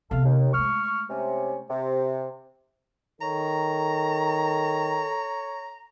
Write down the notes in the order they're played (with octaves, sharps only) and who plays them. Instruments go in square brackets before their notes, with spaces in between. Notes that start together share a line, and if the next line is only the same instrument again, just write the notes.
[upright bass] C3 B3 [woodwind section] A4 F5
[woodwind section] D#2
[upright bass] G#3 A3 [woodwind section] C#6 F6
[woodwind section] C3 C#4
C3
[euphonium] D#3 [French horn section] A4 [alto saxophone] C#5 [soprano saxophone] A#5